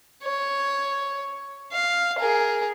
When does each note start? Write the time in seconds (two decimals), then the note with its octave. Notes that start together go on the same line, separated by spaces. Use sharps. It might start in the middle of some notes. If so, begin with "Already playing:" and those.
0.23 C#5
1.72 F5
2.19 G#4 A#4